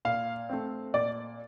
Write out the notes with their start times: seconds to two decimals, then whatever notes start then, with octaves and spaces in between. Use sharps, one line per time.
0.05 A#2 F5
0.49 A3 C4
0.94 A#2 D5